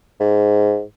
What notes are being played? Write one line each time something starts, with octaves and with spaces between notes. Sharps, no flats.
G#2